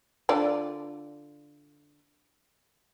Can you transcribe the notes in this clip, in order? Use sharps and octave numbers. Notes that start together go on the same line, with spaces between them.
D3 F4 D5